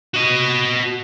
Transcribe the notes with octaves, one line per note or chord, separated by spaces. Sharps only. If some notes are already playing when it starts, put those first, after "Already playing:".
F#4 D#5